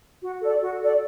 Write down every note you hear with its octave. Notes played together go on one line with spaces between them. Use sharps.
F#4
A4 D5
F#4
A4 D5